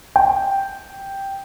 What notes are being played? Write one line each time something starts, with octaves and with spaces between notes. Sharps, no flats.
G5